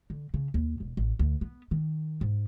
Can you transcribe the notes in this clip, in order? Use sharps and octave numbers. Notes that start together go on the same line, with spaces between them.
D3
C#3
D#2
E1
A1
D2
B3
D#3
G#2